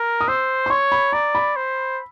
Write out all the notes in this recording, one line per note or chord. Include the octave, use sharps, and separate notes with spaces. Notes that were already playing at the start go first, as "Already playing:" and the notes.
Already playing: A#4
D#6
C5 E6
C6
C#5 C#6
B5
D5 A#5
B5
C5